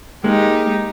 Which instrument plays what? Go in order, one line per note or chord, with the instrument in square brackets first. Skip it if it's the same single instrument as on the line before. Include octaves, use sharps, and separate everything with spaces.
[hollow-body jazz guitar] G#3 A#3 [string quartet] D#4 G4